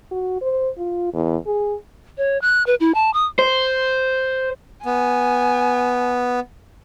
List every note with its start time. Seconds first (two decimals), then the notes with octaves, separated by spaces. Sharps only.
0.12 F#4
0.42 C5
0.78 F4
1.13 E2
1.47 G#4
2.18 C#5
2.41 F#6
2.67 B4
2.80 E4
2.95 A5
3.14 D#6
3.39 C5
4.85 B3 G#5